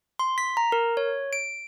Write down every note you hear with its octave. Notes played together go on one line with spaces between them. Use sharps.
C6
B6
A#5
A#4
C#5
D7